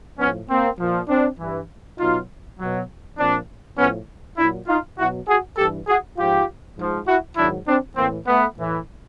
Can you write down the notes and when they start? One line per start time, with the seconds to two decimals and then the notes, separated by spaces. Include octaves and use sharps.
0.19 A2 F3 B3 C#4
0.49 A#3 C4
0.79 A#2 F3
1.08 C4 D4
1.39 G2 E3
1.99 B2 F#3 D#4 F4
2.59 B2 F#3
3.18 A#2 F3 C4 D4
3.78 A2 F3 B3 C#4
4.38 A#2 F#3 D4 E4
4.68 D#4 F4
4.98 B2 F#3 E4 F#4
5.28 F#4 G#4
5.58 G2 E3 G4 A4
5.87 F#4 G#4
6.17 G#2 F3 F4 G4
6.77 G#2 F3
7.07 E4 F#4
7.37 G#2 D#3 F#3 D4 E4
7.67 C4 D4
7.97 A2 E3 A#3 C4
8.27 A3 B3
8.57 A2 E3